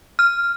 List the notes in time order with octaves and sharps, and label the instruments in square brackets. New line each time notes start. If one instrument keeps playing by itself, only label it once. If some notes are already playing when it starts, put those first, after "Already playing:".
[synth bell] F6